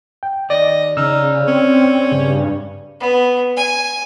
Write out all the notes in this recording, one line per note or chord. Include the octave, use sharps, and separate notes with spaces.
G5
D#2 D5 D#5
C#3 D#4 G#4 D5 E6 F6
C4 C#4
G2 C#3
B3
G#5